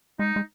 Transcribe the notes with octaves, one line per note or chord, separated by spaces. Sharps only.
G#3 D#4
G#3